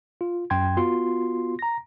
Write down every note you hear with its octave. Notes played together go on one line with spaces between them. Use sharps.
F4
F#2 G5 C6 G#6
B3 F4 F#4 C6
A#5 A#6